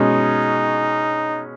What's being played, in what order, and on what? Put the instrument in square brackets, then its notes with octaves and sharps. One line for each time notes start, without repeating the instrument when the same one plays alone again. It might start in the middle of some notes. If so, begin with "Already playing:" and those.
Already playing: [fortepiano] B2 G#3 C#4 [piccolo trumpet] D#4